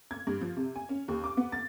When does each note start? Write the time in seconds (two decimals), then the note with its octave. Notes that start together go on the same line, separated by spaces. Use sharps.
0.11 G#6
0.27 G2
0.41 F3
0.57 C3
0.76 G#5
0.89 C#4
1.08 D#2
1.24 D6
1.37 B3
1.52 A6